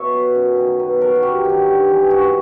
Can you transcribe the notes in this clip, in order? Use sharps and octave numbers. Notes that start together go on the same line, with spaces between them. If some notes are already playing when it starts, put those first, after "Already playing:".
Already playing: B2 C#5 E5
F#3
F#2
D#3 F#3
B2 B4
F#3 A#4
F#4
F#2 G4
D#3 F#3
G2
E3
G#2 F#4